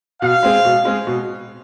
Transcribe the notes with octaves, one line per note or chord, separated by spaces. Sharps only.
B2 F5
G#3 C4 G#4
B2
G#3 C4 G#4
B2